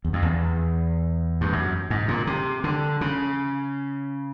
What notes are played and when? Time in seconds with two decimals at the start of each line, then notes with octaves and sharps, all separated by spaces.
0.05 E2
0.13 F2
0.22 E2
1.41 G2
1.53 F#2
1.90 G#2
2.08 A#2
2.27 C3
2.64 D3
3.01 C#3